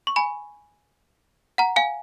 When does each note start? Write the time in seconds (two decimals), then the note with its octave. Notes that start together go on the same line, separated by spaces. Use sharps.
0.07 C#6
0.16 G#5 B5
1.58 F#5 A#5
1.76 F5 G#5